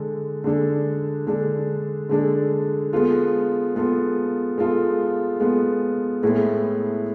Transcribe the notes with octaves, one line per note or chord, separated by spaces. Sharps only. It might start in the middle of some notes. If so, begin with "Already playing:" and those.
Already playing: D3 G#3 D4 A4
D3 G#3 D4 A4
D3 G#3 D4 A4
D3 G#3 D4 A4
G#3 B3 F4 A4
G#3 B3 F4 A4
G#3 B3 F4 A4
G#3 B3 F4 A4
A2 G#3 B3 E4 A4